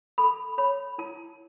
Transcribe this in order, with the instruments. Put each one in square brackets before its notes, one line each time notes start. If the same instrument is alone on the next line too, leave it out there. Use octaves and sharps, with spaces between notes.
[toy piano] A4 B5
C#5 B5
E4 A5